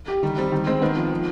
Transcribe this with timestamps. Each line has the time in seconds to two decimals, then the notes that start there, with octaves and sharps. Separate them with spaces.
0.08 G4
0.23 D#3 G3
0.38 G3 C4
0.52 D#3 G3
0.67 G#3 C4
0.82 D#3 B3
0.96 F3
1.11 F3